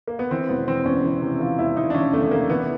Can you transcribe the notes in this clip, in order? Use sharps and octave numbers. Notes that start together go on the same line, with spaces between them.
A#3
B3
E3 C4
E1 B3
E3 C4
E2 C#4
E3
C3
E3 F4
E1 E4
E1 D#4
D4
E3 C#4
E2 A3
C3 A#3
E3 B3